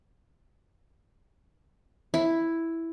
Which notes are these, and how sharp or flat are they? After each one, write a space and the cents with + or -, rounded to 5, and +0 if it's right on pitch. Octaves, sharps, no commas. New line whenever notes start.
E4 +0